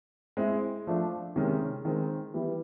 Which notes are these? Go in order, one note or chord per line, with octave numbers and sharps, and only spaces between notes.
G#3 C4 E4
F3 A3 D4
C3 D#3 G#3 C#4
D#3 G#3 C4
E3 G3 B3 E4